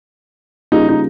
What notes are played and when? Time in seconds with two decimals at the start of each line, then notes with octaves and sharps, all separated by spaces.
0.72 C#3 G3 A#3 D#4 F4 G#4
0.89 D#4